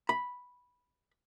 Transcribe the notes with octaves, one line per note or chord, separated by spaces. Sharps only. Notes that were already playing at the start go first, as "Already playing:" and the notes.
B5